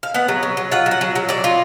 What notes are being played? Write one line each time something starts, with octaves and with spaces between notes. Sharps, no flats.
F5
B3 F#5
F#3
F#3
F#3
F4 F#5
F#3
F#5
F#3
F#3
F#3 D5
F4